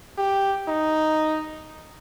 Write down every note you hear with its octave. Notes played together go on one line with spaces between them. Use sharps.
G4
D#4